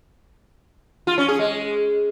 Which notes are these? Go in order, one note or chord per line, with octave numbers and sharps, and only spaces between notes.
F4
C#4
G#4
G#3